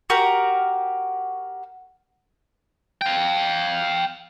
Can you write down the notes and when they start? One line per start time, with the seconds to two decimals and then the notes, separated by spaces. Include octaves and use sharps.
0.10 F#4 G4 A#4
3.01 F5 G5